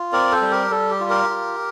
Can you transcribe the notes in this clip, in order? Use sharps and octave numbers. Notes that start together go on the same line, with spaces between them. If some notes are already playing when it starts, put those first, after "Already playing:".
Already playing: F4
C4 A#4 D5
A4 C5
G3
G4 A#4
G3 A4
G4
F4
G4 A#4
F4